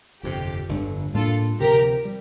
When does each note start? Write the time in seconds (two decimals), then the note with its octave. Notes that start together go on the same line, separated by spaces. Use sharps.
0.23 G1 F2 C3 G4
0.69 G1 F2 D3
1.14 A2 G3 A#3 D4 F4 A4
1.59 D2 C3 F3 G4 A#4
2.05 G3